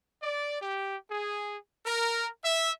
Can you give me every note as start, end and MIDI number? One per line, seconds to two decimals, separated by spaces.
0.21 0.59 74
0.60 0.95 67
1.09 1.55 68
1.85 2.26 70
2.43 2.70 76